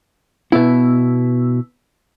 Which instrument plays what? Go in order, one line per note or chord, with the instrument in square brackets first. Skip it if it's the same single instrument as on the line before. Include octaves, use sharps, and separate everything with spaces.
[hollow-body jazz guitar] B2 E4 [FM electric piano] B3 E6